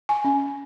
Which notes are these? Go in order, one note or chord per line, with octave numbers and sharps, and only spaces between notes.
G#5
C#4